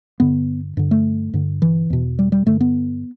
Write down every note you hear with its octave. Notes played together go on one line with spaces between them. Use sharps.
G2 D3 B3
G2 D3
A3
G2 D3
E3
E2 B2
G3
G3
G2 D3 A3
B3